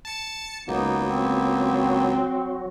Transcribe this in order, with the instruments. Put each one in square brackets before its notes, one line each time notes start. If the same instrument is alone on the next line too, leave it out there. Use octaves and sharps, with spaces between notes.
[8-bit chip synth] A5 C#7
[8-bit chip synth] C#2 [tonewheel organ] F#3 F#4 [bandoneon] A#3 B3 [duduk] D#4
[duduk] C4